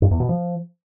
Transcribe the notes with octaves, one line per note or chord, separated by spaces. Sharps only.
G2
E2
B2
F3